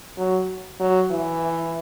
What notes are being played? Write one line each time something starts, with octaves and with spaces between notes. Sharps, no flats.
F#3
F#3
E3